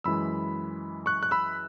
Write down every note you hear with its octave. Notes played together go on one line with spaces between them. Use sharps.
F#2 E3 G#3 B5 E6
C#6 F#6
F#6
B5 E6